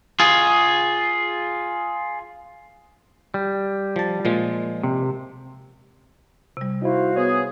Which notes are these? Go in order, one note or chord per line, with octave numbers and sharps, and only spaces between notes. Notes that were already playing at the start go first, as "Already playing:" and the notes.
F4 G#4
G3
F3 A5
A#2 F3 G#3
C3
C3 G3
D#4 E4 F#4 C5 F5
B3 G#4 C#5